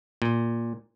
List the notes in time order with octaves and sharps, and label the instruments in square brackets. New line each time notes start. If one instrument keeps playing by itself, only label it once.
[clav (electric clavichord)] A#2